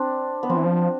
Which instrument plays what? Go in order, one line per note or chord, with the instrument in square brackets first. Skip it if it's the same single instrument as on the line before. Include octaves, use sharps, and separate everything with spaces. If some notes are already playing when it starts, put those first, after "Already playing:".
Already playing: [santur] C4 D4
B3
[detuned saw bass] F3 [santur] C4
[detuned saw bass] E3
F3